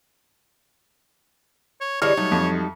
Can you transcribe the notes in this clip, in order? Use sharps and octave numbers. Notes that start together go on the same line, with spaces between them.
C#5
D3 E3 G3 E4 G#4 C#5 D#5 F6
F#3 G3 A3 D#4
F2